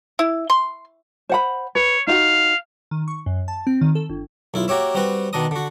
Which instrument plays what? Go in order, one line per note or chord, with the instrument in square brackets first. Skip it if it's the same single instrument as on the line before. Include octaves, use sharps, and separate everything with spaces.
[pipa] E4
C6
[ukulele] C5 F#5 B5
[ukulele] B4 [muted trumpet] C#5
[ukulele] D#4 F4 F#4 [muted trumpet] F5
[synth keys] D#3
C#6
F#2
A5
C4
D#3
A4
G1
[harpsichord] B1 E4 F4
A#3 F#4 G4 C#5 E5
G3 C4 F#4 B4
B2 D#3 D4 D#5 D#6
D3 F#4